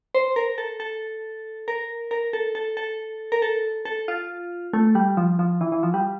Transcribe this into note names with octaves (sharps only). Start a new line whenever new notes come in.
C5
A#4
A4
A4
A#4
A#4
A4
A4
A4
A#4
A4
A4
F4
A3
G3
F3
F3
E3
E3
F3
G3